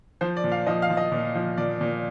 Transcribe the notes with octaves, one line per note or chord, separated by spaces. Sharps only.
F3 C5
D5
A#2
F5
F3 D#5
F5
F3
D#5
A#2
F3
A#2 D5
A#2